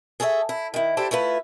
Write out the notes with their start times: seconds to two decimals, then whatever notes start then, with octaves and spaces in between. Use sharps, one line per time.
0.20 G#4 A4 C#5 D5 E5
0.49 E4
0.74 D#3 E4
0.97 D4 E4 G4 A4 C5
1.11 A3 E4 F4 B4